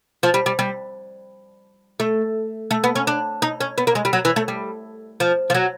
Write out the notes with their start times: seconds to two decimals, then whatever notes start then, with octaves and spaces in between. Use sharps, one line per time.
0.23 F3
0.34 G3
0.46 G3
0.59 G3
2.00 A3
2.71 A3
2.84 B3
2.95 C#4
3.07 D4
3.42 D#4
3.61 C#4
3.78 B3
3.87 A#3
3.95 G#3
4.05 G3
4.13 F#3
4.25 E3
4.36 A3
4.48 G3
5.20 F3
5.50 F3
5.55 F#3